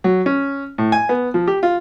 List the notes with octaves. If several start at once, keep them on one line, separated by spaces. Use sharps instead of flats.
F#3
C#4
A2
G#5
B3
F3
G4
F4